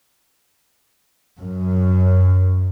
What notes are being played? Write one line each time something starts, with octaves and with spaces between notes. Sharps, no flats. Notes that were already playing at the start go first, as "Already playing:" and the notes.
F#2